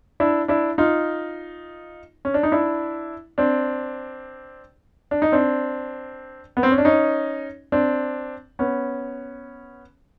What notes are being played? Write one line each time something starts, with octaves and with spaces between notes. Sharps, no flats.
D4 E4
D4 E4
D#4 F4
C#4
D4
D#4
D4 E4
C4 D4
D4
D#4
C4 D4
B3
C4
C#4
D4
C#4 D#4
C4 D4
B3 C#4